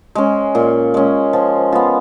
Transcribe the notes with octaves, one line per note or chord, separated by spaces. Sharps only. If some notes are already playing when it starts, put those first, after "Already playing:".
G#3 C#4
A#2
G#3 C#4
F3
B3 F4